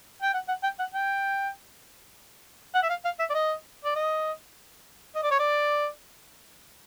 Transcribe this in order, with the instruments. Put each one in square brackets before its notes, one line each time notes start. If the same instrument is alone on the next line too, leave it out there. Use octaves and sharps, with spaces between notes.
[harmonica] G5
F#5
F#5
G5
F#5
G5
F#5
E5
F5
F5
E5
D5
D#5
D5
D#5
D#5
D5
C#5
D5